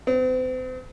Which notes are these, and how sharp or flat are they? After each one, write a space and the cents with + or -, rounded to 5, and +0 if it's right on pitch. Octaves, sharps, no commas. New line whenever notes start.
C4 -40